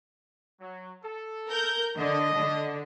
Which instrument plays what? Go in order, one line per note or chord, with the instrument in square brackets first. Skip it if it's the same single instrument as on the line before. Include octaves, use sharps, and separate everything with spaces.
[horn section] F#3
A4
[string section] A#4 G6
[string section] D3 [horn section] D#5
[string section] D3